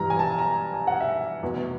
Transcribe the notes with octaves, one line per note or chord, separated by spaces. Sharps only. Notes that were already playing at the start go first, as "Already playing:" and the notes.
Already playing: G2 E3 G3 A#5
G#5
A5
A#5
G#5
F#5
E5
F1 E2 B2